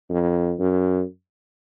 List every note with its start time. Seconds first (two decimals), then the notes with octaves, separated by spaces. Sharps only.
0.10 F2
0.59 F#2